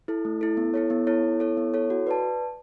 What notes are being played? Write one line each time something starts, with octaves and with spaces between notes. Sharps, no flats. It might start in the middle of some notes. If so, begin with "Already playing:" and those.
E4 A4
A3
E4 A4
B3
E4 A4 C#5
B3
E4 A4 C#5
B3
E4 A4 C#5
B3
E4 A4 C#5
F#4
B4 D5 A5